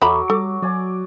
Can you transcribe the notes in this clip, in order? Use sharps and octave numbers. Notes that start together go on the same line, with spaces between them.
E2 F#3 F#4 A4 E5 A#5 B5 D6
G3 A4 D6
F#3 D5 G#5